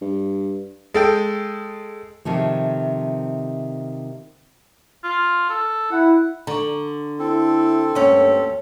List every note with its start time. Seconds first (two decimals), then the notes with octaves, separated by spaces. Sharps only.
0.01 G2
0.94 G#3 A4 G5
2.25 C3 D#3 F3 A3
5.04 F4
5.49 A4
5.92 E4 F#5
6.47 D3 A#5 C#6
7.19 C4 E4 A4
7.95 D2 G2 A#3 C#4 D4 C#5 E6